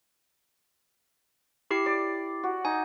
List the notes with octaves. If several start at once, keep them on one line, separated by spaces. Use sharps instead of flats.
E4 G4 D6 C7
D5
F#4
D#4 G#5